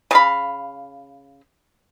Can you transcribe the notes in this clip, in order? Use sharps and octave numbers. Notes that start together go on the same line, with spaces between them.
C#3 F5 B5